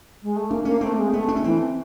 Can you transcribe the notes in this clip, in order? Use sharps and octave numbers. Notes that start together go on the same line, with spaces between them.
G#3
A3
A#3 D4
A#3 C#4
A3 C4
G#3
A3 B3
D4
C#4
E3 C4